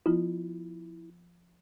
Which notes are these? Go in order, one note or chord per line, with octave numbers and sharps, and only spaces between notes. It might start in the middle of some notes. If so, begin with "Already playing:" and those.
F3 B3 E4 F4